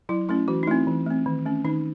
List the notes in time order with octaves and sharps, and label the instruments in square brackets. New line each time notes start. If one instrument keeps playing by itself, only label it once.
[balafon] F#3 E4
A3 C#4 E4
E3 F#4
D#4
A3 C4 E4
E3
A3 C4
D#3
A3 C#4
D#3 D#4